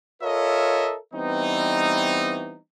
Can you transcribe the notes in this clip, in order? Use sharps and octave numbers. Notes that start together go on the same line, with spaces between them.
F4 A4 A#4 C#5 D#5 E5
E3 G3 B3 C4 D#4